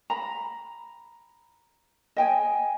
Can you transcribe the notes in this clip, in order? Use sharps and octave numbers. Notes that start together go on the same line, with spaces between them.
A#5 B5
D#5 G5 G#5